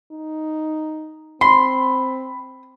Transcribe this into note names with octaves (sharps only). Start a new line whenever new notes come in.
D#4
C4 B5 C6